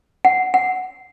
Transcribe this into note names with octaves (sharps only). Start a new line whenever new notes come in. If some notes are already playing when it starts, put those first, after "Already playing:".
F#5
F#5